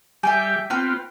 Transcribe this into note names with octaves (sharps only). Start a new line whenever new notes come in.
G3 G4 E5 G5 G#5
B3 C4 F4 B4 G5